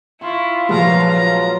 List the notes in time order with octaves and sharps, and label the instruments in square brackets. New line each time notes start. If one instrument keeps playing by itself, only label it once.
[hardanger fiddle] E4 [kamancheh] F4 [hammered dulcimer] C6 C#6
[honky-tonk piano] A#2 F3 G#3 [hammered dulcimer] F#3 B4 [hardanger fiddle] F5 A#5
[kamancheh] F4 [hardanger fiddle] A#5